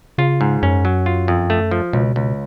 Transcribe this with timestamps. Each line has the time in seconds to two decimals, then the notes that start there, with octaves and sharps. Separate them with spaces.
0.18 C#3 F4
0.41 G#2
0.63 F#2 C#4
0.85 F#3
1.06 F4
1.28 F2
1.50 A3
1.71 F3
1.93 C#2 B2
2.16 C#2